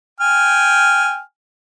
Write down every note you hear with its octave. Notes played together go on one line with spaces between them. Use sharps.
G5 G#5 F6